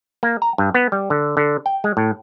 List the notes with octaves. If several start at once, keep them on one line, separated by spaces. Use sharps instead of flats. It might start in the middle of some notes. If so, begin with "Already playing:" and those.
A#3
A#5
G2
B3
G3
D3
D3
G5
G#3
A2